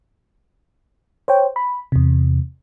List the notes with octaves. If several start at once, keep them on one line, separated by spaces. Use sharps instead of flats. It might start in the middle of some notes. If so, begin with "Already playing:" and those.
C5 C#5 G5
B5
E2 C3